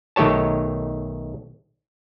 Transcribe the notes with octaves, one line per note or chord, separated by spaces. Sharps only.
B1 D#3 A3 G4 C#5 A5